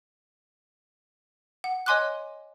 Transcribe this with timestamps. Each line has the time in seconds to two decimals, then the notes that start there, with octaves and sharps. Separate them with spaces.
1.64 F#5
1.86 C#5 D#5 G#5 C6 D6 F#6